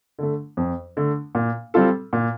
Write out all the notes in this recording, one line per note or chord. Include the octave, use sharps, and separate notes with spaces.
D3 A3
F2
D3 A3
A#2
G3 C4 F4 A4
A#2